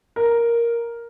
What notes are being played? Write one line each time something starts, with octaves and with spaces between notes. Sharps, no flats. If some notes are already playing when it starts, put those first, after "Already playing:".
A#4